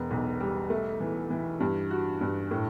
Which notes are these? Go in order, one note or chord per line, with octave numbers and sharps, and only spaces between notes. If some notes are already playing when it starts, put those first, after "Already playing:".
Already playing: E1 B3
B1
G3
A3
E3
E3
G2
F#4
G2
A2